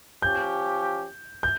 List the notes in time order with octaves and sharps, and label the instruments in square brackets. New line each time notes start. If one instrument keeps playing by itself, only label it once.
[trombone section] F3 C#4 G4 [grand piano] G6
[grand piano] G6